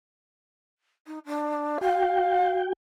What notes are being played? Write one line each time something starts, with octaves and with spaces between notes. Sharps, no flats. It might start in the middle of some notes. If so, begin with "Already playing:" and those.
D#4
D4
F#4 F5 G5